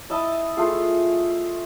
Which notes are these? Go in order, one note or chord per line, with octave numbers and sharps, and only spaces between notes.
E4 D#5 A5
A3 F4 G#4